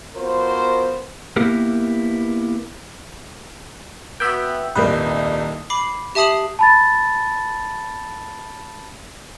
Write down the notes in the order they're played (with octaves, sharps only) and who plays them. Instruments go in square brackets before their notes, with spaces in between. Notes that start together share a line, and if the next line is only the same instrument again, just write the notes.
[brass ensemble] B3 F4 F#4 A#4 C5
[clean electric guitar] A#3 B3 E4 G4 A#4
[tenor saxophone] B3 [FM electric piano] F#4 E5 G5
[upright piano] D#1 C2 A#4 [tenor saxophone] D#4 [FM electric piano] B4 G6
[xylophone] B5 D6 C7
G4 E5 A5 D#6 C7 F#7
[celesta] A5 B5 A6